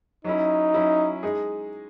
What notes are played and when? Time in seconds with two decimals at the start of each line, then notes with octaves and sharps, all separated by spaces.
0.24 F#3 C#4 D#4 E4
0.74 F#3 C#4 E4
1.23 G#3 D#4 G#4